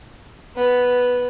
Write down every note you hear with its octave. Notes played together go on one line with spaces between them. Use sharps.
B3